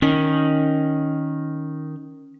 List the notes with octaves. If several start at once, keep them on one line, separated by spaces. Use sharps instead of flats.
D#3 C#4